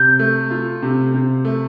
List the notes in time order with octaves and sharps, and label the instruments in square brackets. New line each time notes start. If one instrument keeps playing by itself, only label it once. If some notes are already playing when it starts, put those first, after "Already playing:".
Already playing: [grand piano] C3 [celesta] G6
[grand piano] A3
F4
C3
C3
A3